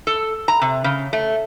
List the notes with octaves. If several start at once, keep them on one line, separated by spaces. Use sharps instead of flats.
A4
A#5
C3
C#3
A3